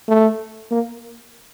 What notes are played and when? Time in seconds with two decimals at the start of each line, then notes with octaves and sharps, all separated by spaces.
0.08 A3
0.71 A#3